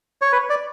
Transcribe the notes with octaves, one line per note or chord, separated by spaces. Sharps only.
C#5
B4
D5